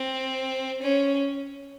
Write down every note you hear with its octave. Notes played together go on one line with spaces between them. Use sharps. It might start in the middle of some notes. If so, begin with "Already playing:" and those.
Already playing: C4
C#4